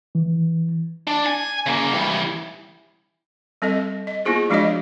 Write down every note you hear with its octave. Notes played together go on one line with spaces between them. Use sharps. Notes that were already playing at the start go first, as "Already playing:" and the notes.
E3
D4
G#5
C#3 A#3
E3 G3
G3 C4 A4 D#5
D#5
A#3 B3 E4 F4 G#4 C5
F3 G#3 D4 F#4 C#5 D#5